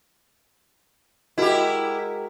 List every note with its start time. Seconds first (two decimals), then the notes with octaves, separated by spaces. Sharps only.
1.38 G#3 E4 F#4 G4 A#4